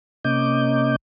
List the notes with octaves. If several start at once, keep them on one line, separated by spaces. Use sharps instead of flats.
C3 A#3 C#4 D#5 D6 G6